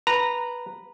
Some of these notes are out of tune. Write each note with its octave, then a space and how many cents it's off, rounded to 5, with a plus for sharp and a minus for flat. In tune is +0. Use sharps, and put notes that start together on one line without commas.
B4 -10 A#5 -10